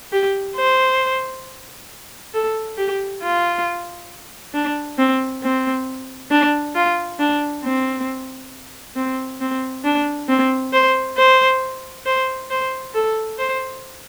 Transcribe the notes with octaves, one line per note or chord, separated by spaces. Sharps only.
G4
C5
A4
G4
F4
D4
C4
C4
D4
F4
D4
C4
C4
C4
D4
C4
C5
C5
C5
C5
A4
C5